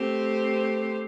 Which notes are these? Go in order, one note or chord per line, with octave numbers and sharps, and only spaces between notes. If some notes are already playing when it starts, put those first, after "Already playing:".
Already playing: A3 C4 G4 C5